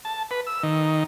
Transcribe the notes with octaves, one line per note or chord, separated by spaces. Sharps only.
A5
B4
E6
D#3